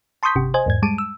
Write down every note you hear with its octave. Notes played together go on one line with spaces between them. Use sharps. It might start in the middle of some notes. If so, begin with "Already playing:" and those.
A5 C6 C#6 D#6 G6 B6
G1 C3 G4
C5 D#5 G#5 G#6
E2 G#2 G#6
G3 G#3 A5 D7 D#7
E6